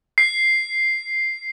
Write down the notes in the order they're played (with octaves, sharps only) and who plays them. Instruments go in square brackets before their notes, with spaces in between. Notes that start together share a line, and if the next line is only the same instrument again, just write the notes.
[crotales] C7